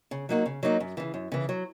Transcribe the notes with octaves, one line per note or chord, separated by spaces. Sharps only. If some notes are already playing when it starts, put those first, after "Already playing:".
C#3
F#3 A#3 D#4 F#4
C#3
F#3 A#3 D#4 F#4
F#2
C#3 E3
F#2
C#3 E3
F#3